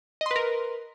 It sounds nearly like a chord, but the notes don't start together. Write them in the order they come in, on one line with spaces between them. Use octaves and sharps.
D#5 C6 B4 A#4